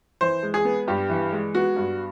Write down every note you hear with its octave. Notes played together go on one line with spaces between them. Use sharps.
E3 C5
G#3
G#4
B3
G2 G4
E3
G#3
B3 F#4
G2